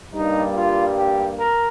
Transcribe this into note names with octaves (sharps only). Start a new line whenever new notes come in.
G2 G3 A#3 D#4
F4
G4
A#4